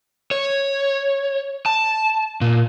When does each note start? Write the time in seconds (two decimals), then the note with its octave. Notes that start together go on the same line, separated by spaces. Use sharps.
0.31 C#5
1.66 A5
2.41 A#2